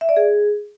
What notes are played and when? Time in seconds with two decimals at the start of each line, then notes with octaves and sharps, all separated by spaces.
0.01 E5
0.09 D5
0.17 G#4